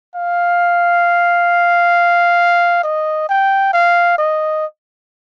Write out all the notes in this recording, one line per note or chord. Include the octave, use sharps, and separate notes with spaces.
F5
D#5
G5
F5
D#5